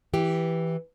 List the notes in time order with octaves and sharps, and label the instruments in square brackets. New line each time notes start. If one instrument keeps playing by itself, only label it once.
[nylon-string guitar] E3 G4